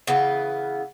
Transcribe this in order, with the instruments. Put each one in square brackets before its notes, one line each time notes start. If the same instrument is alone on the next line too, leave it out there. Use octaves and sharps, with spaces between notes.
[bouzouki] C#3 E3 B3